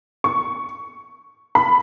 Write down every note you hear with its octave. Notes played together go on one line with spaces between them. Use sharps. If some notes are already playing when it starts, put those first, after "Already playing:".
C#6
B5